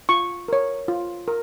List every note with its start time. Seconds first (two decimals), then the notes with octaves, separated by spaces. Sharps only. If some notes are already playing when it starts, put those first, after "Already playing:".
0.09 F4 C#6
0.48 A#4 C#5
0.88 F4
1.28 A#4